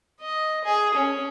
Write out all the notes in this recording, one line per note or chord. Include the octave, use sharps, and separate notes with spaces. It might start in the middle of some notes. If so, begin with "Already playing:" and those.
D#5
G#4
C#4